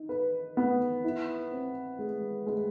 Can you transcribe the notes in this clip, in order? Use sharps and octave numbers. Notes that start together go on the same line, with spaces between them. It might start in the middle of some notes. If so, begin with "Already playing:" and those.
Already playing: D#4
B4
B3
E4
C4
G#3
G#3